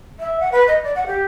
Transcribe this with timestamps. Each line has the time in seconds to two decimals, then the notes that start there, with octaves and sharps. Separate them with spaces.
0.19 E5
0.40 F#5
0.52 B4
0.67 D#5
0.84 D5
0.95 F#5
1.07 G4